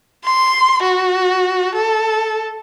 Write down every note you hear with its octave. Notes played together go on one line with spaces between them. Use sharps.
C6
F#4
A4